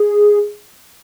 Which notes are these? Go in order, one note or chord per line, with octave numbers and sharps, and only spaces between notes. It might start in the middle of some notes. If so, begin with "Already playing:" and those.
Already playing: G#4